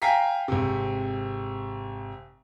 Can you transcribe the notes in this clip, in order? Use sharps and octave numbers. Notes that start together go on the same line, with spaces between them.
F5 G5 G#5 A#5 B6 C7
G#1 C3